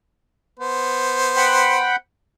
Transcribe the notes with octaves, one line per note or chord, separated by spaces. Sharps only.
B3 C5
F#5 G5 B5